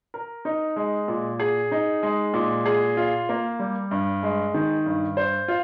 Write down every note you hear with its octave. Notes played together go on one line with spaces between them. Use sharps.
A#4
D#4
G#3
A#2
G#4
D#4
G#3
A#2
G#4
F4
A#3
G3
G2
G#3
D#3
G2
C5
F4